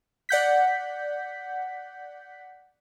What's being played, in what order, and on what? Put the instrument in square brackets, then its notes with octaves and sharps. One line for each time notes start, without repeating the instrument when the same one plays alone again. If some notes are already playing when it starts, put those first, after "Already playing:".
[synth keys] D5 F#5 G6 B6